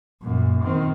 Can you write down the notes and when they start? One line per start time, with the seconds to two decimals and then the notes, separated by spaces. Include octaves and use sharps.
0.22 F#2 A#2
0.63 D#3 C4